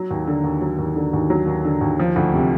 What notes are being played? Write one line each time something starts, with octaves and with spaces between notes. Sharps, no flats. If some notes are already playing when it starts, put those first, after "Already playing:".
Already playing: F#3
D#2
D3
D#2
F#3
D#2
D3
D#2
F#3
D#2
D3
D#2
F3
D2
C3